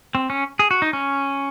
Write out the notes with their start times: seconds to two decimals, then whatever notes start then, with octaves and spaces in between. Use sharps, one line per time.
0.15 C4
0.30 C#4
0.59 G#4
0.71 F#4
0.82 D#4
0.93 C#4